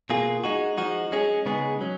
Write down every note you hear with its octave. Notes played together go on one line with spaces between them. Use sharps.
B2 A#3 F4 G#4
G#3 D#4 F#4
F3 G#3 D#4 F#4
G#3 C#4 G#4
C#3 G#3 B3 D#4 G#4
F#3 C#4